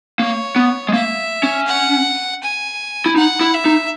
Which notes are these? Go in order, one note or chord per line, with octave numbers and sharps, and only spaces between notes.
A#3 C#5
B3
G#3
A#3 E5
C#4
F#5
G#5
E4
D#4 F#5
E4
E5
D#4